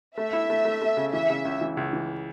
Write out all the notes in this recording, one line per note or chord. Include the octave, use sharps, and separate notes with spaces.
A3 E5
E4
A3
A3
A3
C#3
E3 E5
C#3
C#2
E3
C#2
E3